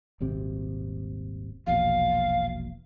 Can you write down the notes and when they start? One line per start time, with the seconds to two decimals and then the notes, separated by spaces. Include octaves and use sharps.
0.20 D#1 G#1 C3
1.67 E1 A#1 B2 F5